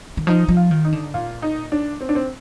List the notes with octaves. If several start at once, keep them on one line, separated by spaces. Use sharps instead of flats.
D#3
F3 D#4
F3
F4
D#3
D#4
D3
A#2 F4
D#4
D4
C4
D4
C4